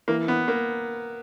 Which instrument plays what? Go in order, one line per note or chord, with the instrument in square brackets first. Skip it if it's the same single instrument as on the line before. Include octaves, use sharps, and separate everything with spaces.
[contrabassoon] E3 [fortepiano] A#3
[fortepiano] B3
A#3